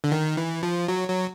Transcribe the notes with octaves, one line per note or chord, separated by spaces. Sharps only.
D3
D#3
E3
F3
F#3
F#3